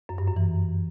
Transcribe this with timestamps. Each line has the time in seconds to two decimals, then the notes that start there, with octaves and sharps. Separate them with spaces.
0.09 F#2
0.18 G2
0.27 F#2
0.36 E3